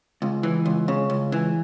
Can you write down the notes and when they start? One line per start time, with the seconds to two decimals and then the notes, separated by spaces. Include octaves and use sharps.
0.22 C#2
0.43 E3
0.66 C#2
0.88 C#3
1.10 C#2
1.32 E3